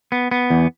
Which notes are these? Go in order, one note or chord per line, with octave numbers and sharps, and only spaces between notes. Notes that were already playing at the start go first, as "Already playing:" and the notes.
B3
B3
E2